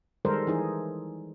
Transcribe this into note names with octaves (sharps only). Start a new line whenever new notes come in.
D#3 G3 G#3 A4 A#4 C5
E3 D#4 G#4